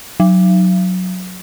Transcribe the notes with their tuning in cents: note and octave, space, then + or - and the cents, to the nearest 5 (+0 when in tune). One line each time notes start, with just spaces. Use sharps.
F#3 -10